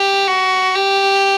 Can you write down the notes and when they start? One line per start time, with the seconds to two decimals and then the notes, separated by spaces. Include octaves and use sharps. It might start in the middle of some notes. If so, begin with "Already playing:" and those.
Already playing: G4
0.27 F#4
0.75 G4